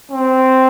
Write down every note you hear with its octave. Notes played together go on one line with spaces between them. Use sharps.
C4